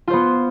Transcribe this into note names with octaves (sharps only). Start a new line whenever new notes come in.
B3 F4 C5